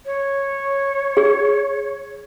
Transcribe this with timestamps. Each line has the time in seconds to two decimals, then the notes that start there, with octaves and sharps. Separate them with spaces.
0.05 C#5
1.17 G#4